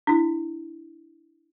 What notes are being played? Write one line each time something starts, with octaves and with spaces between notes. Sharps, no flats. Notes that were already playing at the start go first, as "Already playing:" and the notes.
D4 E4